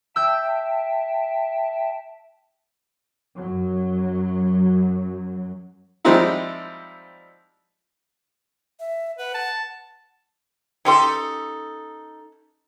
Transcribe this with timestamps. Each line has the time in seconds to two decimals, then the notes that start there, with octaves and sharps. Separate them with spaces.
0.16 E5 G5 A5 E6 G6
3.35 F#2 F#3
6.05 F3 G3 G#3 C4 D#4 E4
8.80 E5
9.18 B4 F#5
9.34 A5
10.85 C#4 D#4 G4 A4 C6